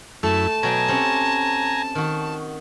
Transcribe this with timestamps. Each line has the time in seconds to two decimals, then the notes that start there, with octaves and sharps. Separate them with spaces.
0.23 F#2 A3 E4 A5
0.63 B2 F#3 G5 G#5 A#5
0.88 C4 C#4 G4
1.95 D#3 F#4